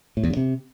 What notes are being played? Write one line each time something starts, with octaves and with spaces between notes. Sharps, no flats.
A2
E2
G2
C3